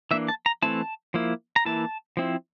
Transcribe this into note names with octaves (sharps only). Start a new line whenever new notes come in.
E3 A#3 D4 E5
A5
A#5
E3 A3 C4 E4 A5
F3 A#3 E4
A#5
E3 A#3 E4 A5
F3 C4 E4